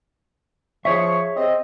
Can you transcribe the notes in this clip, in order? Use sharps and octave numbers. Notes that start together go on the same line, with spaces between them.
F3 G#4 C#5 E5 C#6
C4 D#5